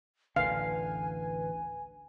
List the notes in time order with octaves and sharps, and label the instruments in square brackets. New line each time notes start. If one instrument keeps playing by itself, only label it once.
[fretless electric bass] A1 D2 D3 [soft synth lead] B4 [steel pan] F5 [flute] G#5